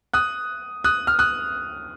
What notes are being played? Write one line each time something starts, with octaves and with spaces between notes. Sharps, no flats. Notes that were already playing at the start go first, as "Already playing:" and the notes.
D#6 F#6
D#6 F#6
F6
D#6 F#6